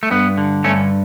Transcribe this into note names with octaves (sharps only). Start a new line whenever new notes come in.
A3
G2 B3
D3
G2 A3 C#4